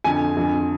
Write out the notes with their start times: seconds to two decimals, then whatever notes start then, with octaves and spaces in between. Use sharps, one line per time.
0.04 F2 D3 G#5
0.37 F2 D3